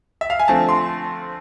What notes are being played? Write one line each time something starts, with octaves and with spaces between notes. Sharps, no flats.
E5
F5
G#5
D3 F3 A3 C4 A5
C6